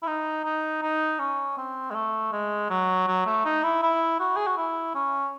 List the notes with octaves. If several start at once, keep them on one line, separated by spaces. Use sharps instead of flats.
E4
D#4
D#4
D#4
C#4
C4
G#3
A3
G#3
F#3
F#3
A3
D#4
E4
E4
F#4
G#4
F#4
E4
C#4